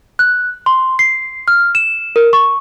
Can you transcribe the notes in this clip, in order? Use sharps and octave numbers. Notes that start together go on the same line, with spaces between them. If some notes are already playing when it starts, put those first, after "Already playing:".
F#6
C6
C7
F6
E7
A#4
C#6